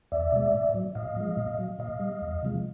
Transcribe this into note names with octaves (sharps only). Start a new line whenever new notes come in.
E2 D5 E5
B2 G#3
A2
F#3
A2 D#5 F5
F3 G#3
A#2
F#3
A#2 D#5 F5
G3
E2
C3 F3 G#3